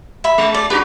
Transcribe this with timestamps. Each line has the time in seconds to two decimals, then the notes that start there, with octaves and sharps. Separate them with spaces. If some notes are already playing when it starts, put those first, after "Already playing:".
0.24 E5 B5
0.38 G#3
0.54 D5
0.70 D4 F#4 G4 B4